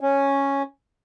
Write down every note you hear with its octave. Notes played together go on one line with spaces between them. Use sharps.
C#4